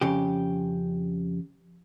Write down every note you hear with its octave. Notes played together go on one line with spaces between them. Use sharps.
F2 C#3 G4